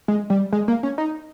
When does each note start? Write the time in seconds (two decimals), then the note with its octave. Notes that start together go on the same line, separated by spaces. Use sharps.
0.08 G#3
0.30 G3
0.53 G#3
0.68 A#3
0.83 C#4
0.98 D#4